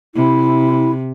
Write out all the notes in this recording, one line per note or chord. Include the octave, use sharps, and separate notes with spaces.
C3 E4